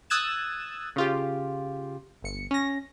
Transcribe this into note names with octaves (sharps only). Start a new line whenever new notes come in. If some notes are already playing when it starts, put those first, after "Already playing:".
D#6 E6 F#6 G#6 A6 E7
C#3 F4 G4
G1 C#7
C#4 A#6